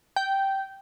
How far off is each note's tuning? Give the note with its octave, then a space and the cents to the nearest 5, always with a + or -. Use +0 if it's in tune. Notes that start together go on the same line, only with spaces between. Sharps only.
G5 -10